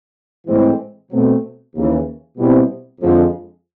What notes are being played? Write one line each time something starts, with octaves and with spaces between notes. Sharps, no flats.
A2 E3 G#3 C4
B2 F#3 A3 C4
D#2 C#3 E3
B2 G3 C4 E4
F2 D3 F3 G#3